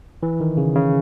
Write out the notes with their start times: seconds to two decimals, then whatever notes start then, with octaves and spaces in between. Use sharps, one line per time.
0.23 E3
0.40 D#3
0.57 C#3
0.75 C#3